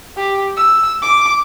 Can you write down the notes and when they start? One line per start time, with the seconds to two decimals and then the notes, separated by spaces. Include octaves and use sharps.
0.17 G4
0.56 E6
1.02 D6